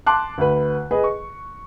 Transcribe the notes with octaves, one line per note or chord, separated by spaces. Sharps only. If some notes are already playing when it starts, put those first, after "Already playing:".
A5 C6 D6 F#6
D2 B4
G#4 B4 D#5
C#6